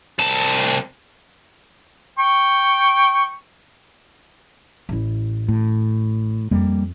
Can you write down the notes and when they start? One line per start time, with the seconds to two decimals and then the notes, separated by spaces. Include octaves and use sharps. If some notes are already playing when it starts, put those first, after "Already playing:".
0.19 C2 A5
2.19 G5 C#6
4.89 A1 E4
5.48 A2
6.51 F2 G3 A#3